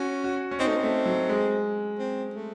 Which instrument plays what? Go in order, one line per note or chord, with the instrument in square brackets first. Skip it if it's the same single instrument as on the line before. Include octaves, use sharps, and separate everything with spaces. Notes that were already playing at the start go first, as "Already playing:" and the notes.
Already playing: [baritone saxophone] C#4 [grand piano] F#4
[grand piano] F#4
C#4
[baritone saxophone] C4 [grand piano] D#4
[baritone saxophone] A3
C4
[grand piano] A3
F#3
G#3
[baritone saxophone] C4
A3